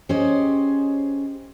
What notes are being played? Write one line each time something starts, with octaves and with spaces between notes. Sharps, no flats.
C#4 G4 G#4 C5 C#5 D#5